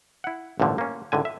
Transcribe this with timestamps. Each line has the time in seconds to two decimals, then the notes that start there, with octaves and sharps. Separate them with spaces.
0.24 E4 F#5
0.60 A1 G2 A#2 D3 F3 A3
0.78 A#3 C#4
1.12 C#2 A2 D3 G#5
1.25 E5